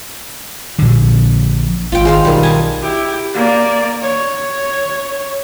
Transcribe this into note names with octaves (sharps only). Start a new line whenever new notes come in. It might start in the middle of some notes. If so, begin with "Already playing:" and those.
A#1 D3
G#1 F4 G5
G#3 C5 F5
B1 D#3 G3
G#5 A5
E4 G4
A#3 D5
C#5